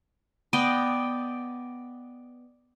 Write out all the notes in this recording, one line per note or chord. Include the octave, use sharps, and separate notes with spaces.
B3 D5 D#5 G5